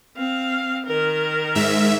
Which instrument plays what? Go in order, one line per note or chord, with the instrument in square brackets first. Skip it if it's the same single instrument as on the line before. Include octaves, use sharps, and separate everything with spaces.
[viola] C4 F5
D#3 A#4
[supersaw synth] G#2 E5